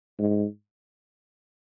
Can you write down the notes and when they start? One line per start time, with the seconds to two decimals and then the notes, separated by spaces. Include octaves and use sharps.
0.19 G#2